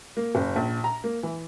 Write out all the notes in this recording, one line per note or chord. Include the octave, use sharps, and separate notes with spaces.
A#3
F#1
A#1
A#5
A#3
E3